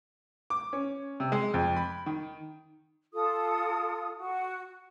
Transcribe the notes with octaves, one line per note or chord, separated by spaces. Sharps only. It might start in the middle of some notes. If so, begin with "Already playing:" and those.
D6
C#4
C3
G#3
F2
B5
D#3
F4 A4 D#6
F#4